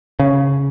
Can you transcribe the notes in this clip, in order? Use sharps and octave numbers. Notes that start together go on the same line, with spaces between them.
C#3